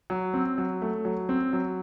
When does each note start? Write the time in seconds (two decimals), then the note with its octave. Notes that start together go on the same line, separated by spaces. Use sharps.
0.10 F#3
0.34 C4
0.58 F#3
0.82 A3
1.05 F#3
1.29 C4
1.53 F#3